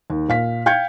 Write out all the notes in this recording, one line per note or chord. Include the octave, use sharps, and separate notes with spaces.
D#2
A#2 F5 B6
F5 G5 G6 G#6 C#7